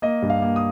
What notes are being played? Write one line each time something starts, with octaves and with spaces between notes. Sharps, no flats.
A#3 D#5
G2
F5
A#3
D#6